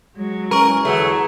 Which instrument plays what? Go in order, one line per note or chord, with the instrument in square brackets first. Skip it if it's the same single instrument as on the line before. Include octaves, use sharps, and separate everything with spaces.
[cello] F#3 G#3
[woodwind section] F#2 E3 C#4 [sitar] A#4 [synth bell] A#5 C#6
[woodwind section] E2 D3 [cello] E3 G#4 [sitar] F#3 A3